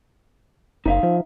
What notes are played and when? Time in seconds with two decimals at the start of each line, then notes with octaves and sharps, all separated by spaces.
0.86 F#1 D#4 E5 F5
1.03 F3